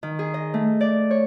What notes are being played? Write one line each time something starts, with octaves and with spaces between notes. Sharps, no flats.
D#3
G#4
D#5
A3
D5
C#5